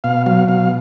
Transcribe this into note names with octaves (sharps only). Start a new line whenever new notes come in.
B2 F5
F#3 F5
B2 F5